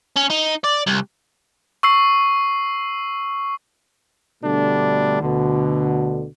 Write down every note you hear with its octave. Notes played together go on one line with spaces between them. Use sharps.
C#4
D#4
D5
C2
C#6 E6 C7
B2 D3 G3 A3 D4
D2 B2 D3